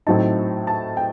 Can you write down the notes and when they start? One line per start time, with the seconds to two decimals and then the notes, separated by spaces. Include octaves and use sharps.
0.07 A2 F#3 C4 D#4 A5
0.67 A5
0.97 G5